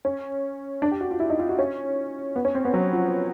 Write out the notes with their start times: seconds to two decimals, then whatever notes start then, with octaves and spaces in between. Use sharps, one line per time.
0.05 C#4
0.82 D4
0.92 G4
1.01 F#4
1.11 F4
1.20 E4
1.30 D#4
1.39 F4
1.49 F#4
1.59 C#4
2.36 B3
2.45 C#4
2.55 C4
2.65 B3
2.74 F#3
2.93 F3